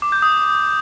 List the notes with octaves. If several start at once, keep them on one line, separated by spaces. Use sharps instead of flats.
D6
G6
D#6